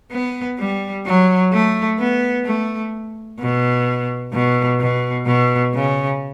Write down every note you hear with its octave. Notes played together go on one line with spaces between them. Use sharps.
B3
G3
F#3
A3
B3
A3
B2
B2
B2
B2
C#3